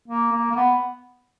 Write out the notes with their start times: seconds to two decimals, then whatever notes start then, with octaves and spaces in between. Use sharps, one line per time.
0.08 A#3
0.32 A#3
0.51 A#3
0.56 B3